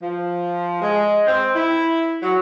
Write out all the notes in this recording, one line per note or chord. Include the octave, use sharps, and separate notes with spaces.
F3
G#3
C4
E4
F#3